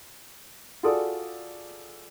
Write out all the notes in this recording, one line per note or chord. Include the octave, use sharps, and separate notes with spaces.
F4 F#4 G#4 A4 D5 D#6